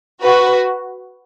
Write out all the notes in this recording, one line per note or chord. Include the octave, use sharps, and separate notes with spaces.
F#4 B4